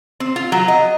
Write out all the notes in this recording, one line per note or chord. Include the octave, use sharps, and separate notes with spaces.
C4
F4
F#3
D#5